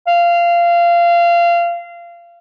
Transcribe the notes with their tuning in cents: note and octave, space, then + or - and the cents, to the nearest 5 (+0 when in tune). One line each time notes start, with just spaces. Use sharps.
F5 -20